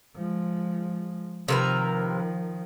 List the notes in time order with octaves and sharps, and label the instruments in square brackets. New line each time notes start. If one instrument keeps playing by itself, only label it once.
[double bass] F3 G#3
[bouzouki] C3 A#4 B4 [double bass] D#3 F3